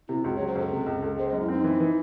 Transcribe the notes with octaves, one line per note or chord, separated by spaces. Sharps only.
C3 E4
C#2 F#4
F#3 C#5
C5
C#2 A4
C3
C#2
C#2
G#3 C5
F#2 D#5
E4
C4 D#4
E3
E3